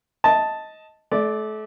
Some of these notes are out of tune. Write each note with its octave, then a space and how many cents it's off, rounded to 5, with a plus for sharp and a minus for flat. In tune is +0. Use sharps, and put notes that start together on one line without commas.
D#5 +15 A5 +0
A3 -35 D5 +0